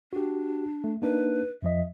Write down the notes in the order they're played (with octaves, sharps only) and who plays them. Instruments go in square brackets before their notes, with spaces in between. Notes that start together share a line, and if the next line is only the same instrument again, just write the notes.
[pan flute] D4 [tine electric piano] F#4 G4
[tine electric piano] A3
[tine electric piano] A#3 D4 D#4 [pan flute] B4
[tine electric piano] F2 F3 D#5 [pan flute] E5